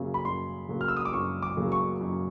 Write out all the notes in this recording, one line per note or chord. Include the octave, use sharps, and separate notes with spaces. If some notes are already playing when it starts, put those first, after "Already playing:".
Already playing: F#2 C#3 F#3 A#3
B5
F#2 C6
C#3 F#3 A#3
F6
E6
D#6
D6
F#2 C#6
D6
C#3 F#3 A#3
C#6
F#2